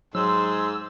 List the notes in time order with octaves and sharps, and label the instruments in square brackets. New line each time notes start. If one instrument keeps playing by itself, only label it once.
[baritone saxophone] G#2 [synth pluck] F#3 [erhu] C6 [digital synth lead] E6